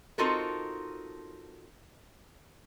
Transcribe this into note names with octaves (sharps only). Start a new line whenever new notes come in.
C4 D#4 F4 F#4 A4 A#4